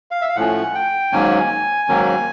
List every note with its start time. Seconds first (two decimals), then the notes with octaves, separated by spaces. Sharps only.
0.11 F5
0.21 E5
0.29 F5
0.36 A2 F3 A3 C#4 F#5
0.75 G5
1.12 G#2 D#3 F#3 A#3 C#4 G#5
1.88 G#2 D#3 F#3 A#3 C#4